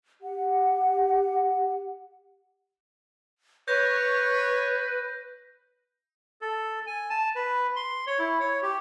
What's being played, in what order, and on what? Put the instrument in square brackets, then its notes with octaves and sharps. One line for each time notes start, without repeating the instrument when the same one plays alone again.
[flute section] G4 F#5
[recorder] B4 [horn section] C#5 [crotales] G6 A#6
[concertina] A4
G#5
A5
B4
C6
C#5
E4
C#5
G4